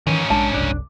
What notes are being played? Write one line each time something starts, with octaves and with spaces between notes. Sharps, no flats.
G#2 D#3 E3 C#4
A#1 G#3 D4 A5
F#1 C2 D4